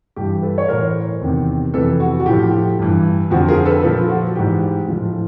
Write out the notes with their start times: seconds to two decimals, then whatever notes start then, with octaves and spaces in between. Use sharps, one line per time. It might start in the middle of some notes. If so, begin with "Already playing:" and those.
0.16 G2 E3 G4
0.43 A4 B4
0.58 C#5
0.68 A2 E3 A#4 C5
1.21 E2 C3 D#3
1.74 F2 C3 E3 A4 B4
2.00 F#4
2.20 F#4
2.26 A2 F3 G4
2.79 G2 E3
3.31 F2 D3 F3 F#4
3.48 G#4 A#4
3.65 A4 B4
3.83 A#2 F3 A4 B4
4.09 F#4
4.35 G#2 E3 G4
4.88 A2 F3